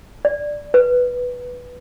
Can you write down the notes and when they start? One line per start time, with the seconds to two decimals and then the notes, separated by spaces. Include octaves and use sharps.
0.25 D5
0.74 B4